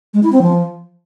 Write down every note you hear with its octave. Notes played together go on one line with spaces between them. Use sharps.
G#3
E4
C4
F3